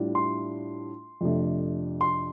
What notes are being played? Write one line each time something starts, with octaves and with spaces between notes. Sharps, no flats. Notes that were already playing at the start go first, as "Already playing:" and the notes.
Already playing: A2 G3 D4 F4
C6
F2 C3 A3 D4
C6